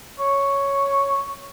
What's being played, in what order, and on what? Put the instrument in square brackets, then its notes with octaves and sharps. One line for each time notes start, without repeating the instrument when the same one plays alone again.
[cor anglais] C#5